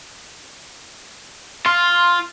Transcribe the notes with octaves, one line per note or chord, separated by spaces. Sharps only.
F4 C6